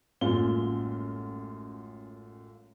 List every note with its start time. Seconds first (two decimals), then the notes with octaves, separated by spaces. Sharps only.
0.21 A1 F#2 G#3 A#3 F4 G7